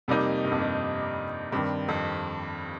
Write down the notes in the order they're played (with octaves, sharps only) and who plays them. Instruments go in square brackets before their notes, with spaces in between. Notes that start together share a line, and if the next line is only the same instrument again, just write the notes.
[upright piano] F2 [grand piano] C3 G3 A#3 D#4
[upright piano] G2
F2
G2
[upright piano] G2 [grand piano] D#3 G3 C4
[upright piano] F2